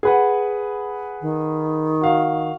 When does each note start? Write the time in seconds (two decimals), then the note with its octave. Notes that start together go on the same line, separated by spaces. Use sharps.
0.03 G#4 B4 F#5
1.22 D#3
2.01 F#4 F5